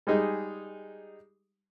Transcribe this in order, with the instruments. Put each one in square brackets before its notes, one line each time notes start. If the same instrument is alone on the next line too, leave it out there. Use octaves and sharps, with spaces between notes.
[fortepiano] G3 G#3 D#4 G#4